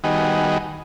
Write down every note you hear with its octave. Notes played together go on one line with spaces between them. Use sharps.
D#3 G3 B3 D#4 F#4 G#4